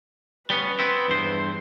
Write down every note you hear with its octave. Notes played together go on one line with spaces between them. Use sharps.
G3 B3 C#4 B4
B3 C4 E4
E2 G2 C5